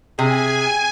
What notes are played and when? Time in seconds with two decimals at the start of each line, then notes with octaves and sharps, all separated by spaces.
0.19 C3 G#4 G#5